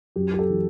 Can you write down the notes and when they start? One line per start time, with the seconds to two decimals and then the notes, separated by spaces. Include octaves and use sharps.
0.16 F#2 G4
0.34 G4
0.39 A4
0.50 E3